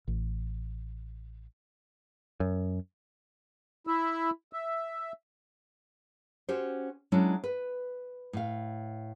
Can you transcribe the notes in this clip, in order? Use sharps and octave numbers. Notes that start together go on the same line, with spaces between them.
A1
F#2
E4 E5
E5
C#4 F#4 G4 C5
F#3 G#3 C#4 D4 E4
B4
A2 F5